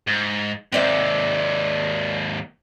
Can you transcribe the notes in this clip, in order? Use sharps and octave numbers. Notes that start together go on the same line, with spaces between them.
G#2
D#2 G#2 C4 D5 E5